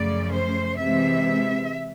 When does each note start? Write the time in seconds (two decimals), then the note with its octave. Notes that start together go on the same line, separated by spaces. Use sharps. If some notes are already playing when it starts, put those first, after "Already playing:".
Already playing: F#2 C#3 F3 A3 C#4 D5
0.32 C5
0.78 C3 E3 G#3 C4 E5